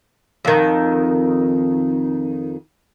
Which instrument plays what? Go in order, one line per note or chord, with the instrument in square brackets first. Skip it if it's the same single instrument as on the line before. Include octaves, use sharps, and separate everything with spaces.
[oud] F2 D#3